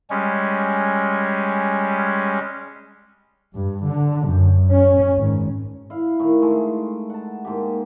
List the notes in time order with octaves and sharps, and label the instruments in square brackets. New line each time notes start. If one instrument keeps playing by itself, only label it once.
[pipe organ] G3 G#3 C#4
[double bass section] G2
D3
F#2
C#4
G#1
[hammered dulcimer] E4 F5
A2 D#3
G#3 A3
F#5 A5
G#2 A#3 G4